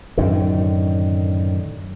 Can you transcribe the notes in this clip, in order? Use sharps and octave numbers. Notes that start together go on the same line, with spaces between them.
F#2 A2 D3 D#3